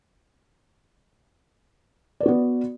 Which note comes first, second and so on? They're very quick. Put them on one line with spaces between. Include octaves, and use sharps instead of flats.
D5 B4 F#4 B3